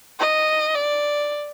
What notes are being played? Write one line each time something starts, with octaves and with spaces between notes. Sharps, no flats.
D#5
D5